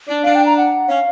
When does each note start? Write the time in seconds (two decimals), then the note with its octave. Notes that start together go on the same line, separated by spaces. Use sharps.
0.08 D4
0.24 D4 F5
0.35 G5
0.46 A#5
0.57 F#5
0.89 C#4 F5